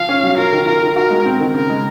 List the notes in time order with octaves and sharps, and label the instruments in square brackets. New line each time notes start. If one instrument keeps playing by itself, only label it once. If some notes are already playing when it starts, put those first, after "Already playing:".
Already playing: [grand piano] F3 [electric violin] F5
[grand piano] C#4
F#3
[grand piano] F4 [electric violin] A#4
[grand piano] D#3
[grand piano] F4 [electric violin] A#4
[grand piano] D#3
[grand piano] F#4 [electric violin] A#4
[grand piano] G#3
C4
D#3
[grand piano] C#3 [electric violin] A#4
[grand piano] G#3